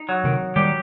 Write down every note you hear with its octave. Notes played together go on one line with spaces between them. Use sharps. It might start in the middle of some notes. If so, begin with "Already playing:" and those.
Already playing: D#4
F#3
C3 D#3
D#3 G3 G4